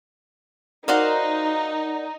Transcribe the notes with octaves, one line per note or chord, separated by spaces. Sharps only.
D#4 F#4 A#4 C5 D5 F5 F#5